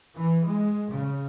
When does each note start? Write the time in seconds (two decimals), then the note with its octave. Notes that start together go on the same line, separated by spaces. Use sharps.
0.16 E3
0.45 G#3
0.91 C#3